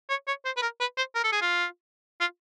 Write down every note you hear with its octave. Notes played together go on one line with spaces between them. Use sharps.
C#5
C#5
C5
B4
A#4
B4
C5
A#4
A4
G#4
F4
F4